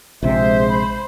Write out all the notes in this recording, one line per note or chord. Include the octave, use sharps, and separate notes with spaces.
A#1 C3 G#3 C5 E5
B5